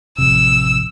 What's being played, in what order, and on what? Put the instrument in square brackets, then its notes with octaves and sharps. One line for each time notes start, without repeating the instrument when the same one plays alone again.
[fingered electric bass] A1 F2 C3 [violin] E6